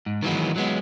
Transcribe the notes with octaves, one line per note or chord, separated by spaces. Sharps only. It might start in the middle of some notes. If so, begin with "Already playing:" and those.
G#2
D#3 E3 F#3 G#3 B3
F#3 G#3 B3